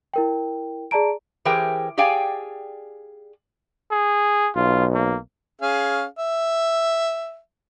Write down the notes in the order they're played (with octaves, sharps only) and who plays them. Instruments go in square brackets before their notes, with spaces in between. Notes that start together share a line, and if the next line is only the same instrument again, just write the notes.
[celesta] E4 A#4 G5
G#4 D5 A5 A#5 D7
[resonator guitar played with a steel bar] E3 G4 G#4 A#4 C5 G5
G4 G#4 D5 F5 G5 G#5
[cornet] G#4
[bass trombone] B1 [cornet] F4
[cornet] A#3
[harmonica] C#4 G#4 F5
E5